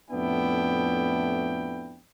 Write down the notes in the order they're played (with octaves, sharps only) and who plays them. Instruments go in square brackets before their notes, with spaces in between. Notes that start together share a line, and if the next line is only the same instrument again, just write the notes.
[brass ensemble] F2 A2 B3 D4 E4 G5